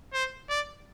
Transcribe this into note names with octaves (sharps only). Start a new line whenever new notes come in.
C5
D5